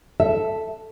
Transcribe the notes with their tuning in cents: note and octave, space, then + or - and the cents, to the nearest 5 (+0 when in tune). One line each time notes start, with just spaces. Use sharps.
A4 +0 E5 +0